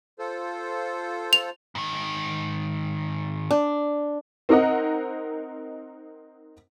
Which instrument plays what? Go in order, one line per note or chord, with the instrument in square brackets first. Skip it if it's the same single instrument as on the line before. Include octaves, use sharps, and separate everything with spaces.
[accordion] F4 A4 C5
[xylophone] F7
[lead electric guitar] G#2 D#3
[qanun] D4
[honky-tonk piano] C4 D#4 A#4 D#5 F#5